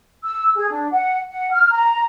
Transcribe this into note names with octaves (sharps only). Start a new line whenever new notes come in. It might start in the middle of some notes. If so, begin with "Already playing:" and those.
E6
G#4
D4
F#5
F#5
F6
A#5